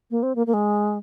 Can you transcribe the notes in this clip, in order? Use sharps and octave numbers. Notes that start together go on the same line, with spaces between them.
A#3
C4
A#3
A#3
G#3